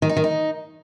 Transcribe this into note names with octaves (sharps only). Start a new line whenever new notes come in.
D#3
D#4
D#3
D#4